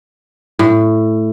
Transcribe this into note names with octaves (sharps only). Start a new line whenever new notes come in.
A2